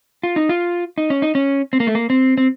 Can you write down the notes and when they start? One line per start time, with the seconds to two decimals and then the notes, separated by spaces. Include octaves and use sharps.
0.23 F4
0.36 D#4
0.49 F4
0.98 D#4
1.10 C#4
1.22 D#4
1.35 C#4
1.73 C4
1.80 A#3
1.87 A3
1.95 A#3
2.10 C4
2.38 C4